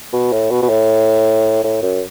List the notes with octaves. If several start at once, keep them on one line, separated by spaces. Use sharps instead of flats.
B2
A2
B2
B2
A2
A2
F#2